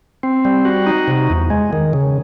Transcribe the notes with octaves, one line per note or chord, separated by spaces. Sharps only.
C4
G3
F#4
D#4
C3
E2
G#3
D#3
C#3